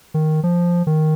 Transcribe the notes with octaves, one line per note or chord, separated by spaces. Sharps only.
D#3
F3
D#3